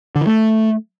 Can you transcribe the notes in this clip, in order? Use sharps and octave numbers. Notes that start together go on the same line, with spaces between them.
D3
E3
A3